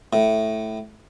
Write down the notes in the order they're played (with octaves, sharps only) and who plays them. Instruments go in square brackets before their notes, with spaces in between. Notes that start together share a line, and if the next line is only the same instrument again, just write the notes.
[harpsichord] A2